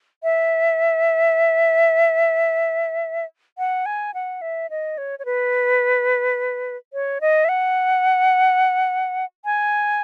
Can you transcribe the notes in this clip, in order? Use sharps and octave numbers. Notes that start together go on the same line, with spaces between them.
E5
F#5
G#5
F#5
E5
D#5
C#5
C#5
B4
C#5
D#5
E5
F#5
G#5